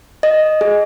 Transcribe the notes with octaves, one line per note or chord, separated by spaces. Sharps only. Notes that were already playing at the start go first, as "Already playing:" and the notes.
D#5
G#4